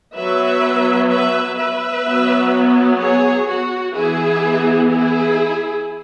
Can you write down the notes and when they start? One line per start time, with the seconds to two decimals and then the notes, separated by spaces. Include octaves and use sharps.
0.15 F#3 B3 B4 E5
1.10 B4 E5
1.58 B4 E5
2.06 F#3 B3
3.00 G#4 C#5
3.47 F#4
3.95 E3 B3 E4 G#4
4.91 E4 G#4